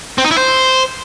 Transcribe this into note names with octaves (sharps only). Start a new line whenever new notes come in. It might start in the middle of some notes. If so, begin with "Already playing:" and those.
C4
D#4
E4
C5